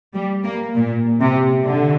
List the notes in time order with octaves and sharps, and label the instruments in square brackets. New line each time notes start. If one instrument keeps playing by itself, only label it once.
[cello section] G3
A#3
A#2
C3
D3